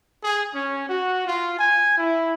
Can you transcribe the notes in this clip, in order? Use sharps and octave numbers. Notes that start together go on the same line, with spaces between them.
G#4
C#4
F#4
F4
G#5
E4